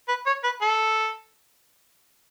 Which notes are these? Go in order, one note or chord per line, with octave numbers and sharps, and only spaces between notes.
B4
C#5
B4
A4